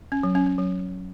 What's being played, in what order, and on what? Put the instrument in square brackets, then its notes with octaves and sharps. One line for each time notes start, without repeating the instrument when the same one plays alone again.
[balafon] C#4
F#3
C#4
C#4
F#3